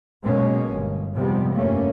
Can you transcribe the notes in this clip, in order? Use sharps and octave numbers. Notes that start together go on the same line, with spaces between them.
B2 F#3 G#3 A#3 C#4
G1
F2 G#2 C3 F3 G3 B3
F1 G2 A3 A#3 C#4